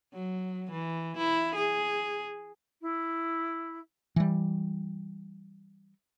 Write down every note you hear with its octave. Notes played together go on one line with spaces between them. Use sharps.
F#3
E3
E4
G#4
E4
E3 G3